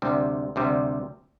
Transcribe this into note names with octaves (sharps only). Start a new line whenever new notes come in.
D2 C3 G3
D2 C3 G3